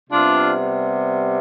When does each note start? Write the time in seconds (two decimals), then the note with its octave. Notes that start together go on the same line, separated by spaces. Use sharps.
0.10 C3 G3 B3 D4 F4